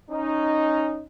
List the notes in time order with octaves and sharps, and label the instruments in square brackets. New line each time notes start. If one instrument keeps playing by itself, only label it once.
[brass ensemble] C#4 D#4